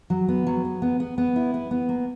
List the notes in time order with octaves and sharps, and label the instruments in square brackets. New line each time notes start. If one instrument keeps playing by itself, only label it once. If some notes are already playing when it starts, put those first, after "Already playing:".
[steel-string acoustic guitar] F#3
B3
F#3
B3
B3
B3
B3
E4
B3
B3
A#3